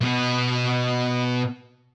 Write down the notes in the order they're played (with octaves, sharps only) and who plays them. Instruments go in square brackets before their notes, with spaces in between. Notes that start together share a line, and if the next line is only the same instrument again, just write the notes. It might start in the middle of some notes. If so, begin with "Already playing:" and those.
[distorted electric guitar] B2 B3